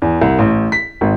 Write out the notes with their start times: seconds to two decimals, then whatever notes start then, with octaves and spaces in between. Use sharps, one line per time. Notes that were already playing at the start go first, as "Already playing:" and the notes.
0.02 E2
0.21 C2
0.39 A1
0.72 B6
1.01 G#1